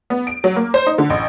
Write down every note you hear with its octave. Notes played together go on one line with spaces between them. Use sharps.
B3
D7
F#3
A#3
C5
D#4
D3
A1